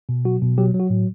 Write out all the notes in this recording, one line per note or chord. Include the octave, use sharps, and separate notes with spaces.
B2
F#3 F#4
B2
F#3 G4
F#3
F#4
A2